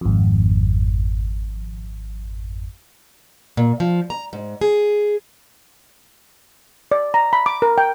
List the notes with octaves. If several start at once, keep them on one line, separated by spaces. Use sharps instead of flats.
G#1 F2
A#2
F3
A#5
G#2
G#4
D5
A#5
B5
D6
A#4
G5